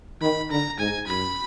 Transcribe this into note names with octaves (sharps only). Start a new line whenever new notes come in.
D#3 B5
D3 A#5
G#2 G#5
F#2 B5